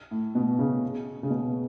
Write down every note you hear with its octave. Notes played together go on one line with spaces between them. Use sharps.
A2
B2
C#3
C#3
B2